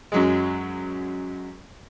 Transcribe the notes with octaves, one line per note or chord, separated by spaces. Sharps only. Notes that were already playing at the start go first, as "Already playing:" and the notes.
F#2 F#3 G#3